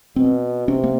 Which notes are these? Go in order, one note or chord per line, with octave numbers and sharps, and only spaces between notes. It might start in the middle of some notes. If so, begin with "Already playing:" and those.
B2 C4
C3 C#4
A#3